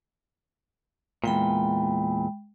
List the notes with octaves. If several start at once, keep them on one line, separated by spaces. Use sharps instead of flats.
E2 G2 A#2 G#3 G5 B5